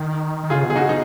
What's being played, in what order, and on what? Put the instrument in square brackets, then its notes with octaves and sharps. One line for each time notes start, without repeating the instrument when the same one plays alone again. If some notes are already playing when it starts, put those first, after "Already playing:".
Already playing: [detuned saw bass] D#3
D#3
[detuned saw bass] C#3 [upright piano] F4 G#4
[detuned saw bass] B2
[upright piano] G#4
[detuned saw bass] C#3 [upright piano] D#4 F#4
[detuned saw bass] B2 [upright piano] D#4